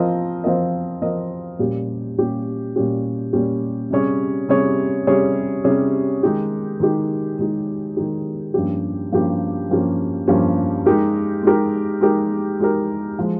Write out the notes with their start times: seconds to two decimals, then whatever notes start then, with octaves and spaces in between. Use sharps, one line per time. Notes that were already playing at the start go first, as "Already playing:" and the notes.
Already playing: F3 C4 F4 A#4 D#5
0.44 F3 C4 F4 A#4 D#5
1.02 F3 C4 F4 A#4 D#5
1.59 A#2 G3 C#4 G4
2.18 A#2 G3 C#4 G4
2.76 A#2 G3 C#4 G4
3.33 A#2 G3 C#4 G4
3.90 C3 G3 C#4 G#4 C#5
4.49 C3 G3 C#4 G#4 C#5
5.07 C3 G3 C#4 G#4 C#5
5.64 C3 G3 C#4 G#4 C#5
6.23 D#3 G#3 D#4 G4
6.80 D#3 G#3 D#4 G4
7.39 D#3 G#3 D#4 G4
7.97 D#3 G#3 D#4 G4
8.54 G2 F3 A#3 C#4 G4
9.12 G2 F3 A#3 C#4 G4
9.69 G2 F3 A#3 C#4 G4
10.27 G2 F3 A#3 C#4 G4
10.86 G#3 D#4 G4 A#4
11.43 G#3 D#4 G4 A#4
12.01 G#3 D#4 G4 A#4
12.59 G#3 D#4 G4 A#4
13.19 F3 G#3